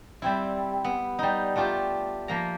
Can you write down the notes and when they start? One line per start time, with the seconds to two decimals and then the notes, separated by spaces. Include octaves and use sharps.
0.22 G3 C4 E4
0.84 B3
1.19 G3 D#4
1.56 A3 D4 F4 G4
2.28 F3 A#3 A#5